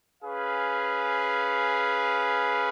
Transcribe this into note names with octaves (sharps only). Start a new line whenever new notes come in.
C#4 G#4 B4 F5